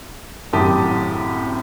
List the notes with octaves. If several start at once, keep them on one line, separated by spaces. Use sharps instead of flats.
G#1 F#2 A2 G4 A5 D#6